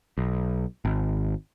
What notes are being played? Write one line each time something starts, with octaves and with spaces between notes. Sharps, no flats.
B1
G#1